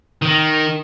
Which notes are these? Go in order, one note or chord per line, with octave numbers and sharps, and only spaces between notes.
D#3